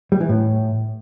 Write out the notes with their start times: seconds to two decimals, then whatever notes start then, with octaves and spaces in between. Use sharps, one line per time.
0.12 G3
0.21 E3
0.29 A2